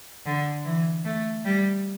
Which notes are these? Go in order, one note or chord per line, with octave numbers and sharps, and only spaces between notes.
D3
E3
A3
G3